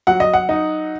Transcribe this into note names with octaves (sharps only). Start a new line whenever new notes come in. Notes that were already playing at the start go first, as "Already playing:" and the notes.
F#3 F#5
D#5
F#5
D#4